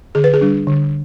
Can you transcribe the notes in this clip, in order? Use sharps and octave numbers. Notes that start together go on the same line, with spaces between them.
D3 G#4
B4
G#4
G3 D4
D3